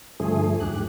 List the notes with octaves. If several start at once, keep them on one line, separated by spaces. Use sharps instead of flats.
G2 D3 F3 A3 G#4
D#2 G#2 G4 F#6